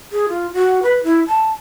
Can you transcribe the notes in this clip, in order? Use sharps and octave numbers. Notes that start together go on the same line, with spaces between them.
G#4
F4
F#4
B4
E4
A5